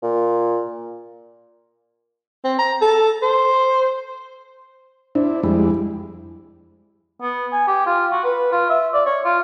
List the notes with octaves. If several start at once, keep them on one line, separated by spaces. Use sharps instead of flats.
A#2
C4
A#5
A4
C5
D4 E4 C5
F2 G3 G#3 E4
B3
G#5
G4
F4
F#4
B4
F4
E5
D5
C#5
F4